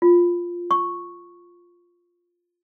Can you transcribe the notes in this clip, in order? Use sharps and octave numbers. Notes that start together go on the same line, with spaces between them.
F4
C#6